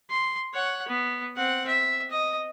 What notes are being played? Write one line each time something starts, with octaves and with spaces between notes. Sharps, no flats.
C6
C#5 F#5
B3
C4 F#5
E5
D#5